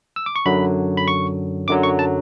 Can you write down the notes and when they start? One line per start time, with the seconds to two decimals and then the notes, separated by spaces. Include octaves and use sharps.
0.16 E6
0.26 D6
0.36 C#6
0.46 F#2 D3 F#3 B5
0.97 B5
1.08 C#6
1.68 F#2 D3 F#3 D6
1.83 C#6
1.99 A5